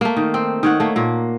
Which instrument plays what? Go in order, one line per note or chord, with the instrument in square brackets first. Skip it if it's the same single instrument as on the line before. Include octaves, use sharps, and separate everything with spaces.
[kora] A3 A#3
D#3
C4
D#3 C#5 F#5
A3 A#3
A#2 A#3